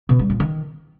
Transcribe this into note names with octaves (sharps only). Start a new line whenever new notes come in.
B2
G3
A#2
D#3